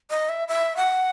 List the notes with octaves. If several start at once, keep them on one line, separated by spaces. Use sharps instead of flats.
D#5
E5
E5
F#5